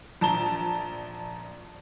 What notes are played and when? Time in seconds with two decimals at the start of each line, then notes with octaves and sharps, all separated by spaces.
0.21 A#1 A5 A#5 G7